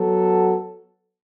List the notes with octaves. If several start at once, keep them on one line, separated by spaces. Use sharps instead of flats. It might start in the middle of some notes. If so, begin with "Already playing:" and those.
Already playing: F#3 B3 F#4 A4